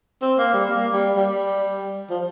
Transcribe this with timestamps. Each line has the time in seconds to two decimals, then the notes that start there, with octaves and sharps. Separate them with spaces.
0.22 C4
0.39 A#3
0.54 G3
0.70 A#3
0.93 G3
1.16 G3
2.10 F3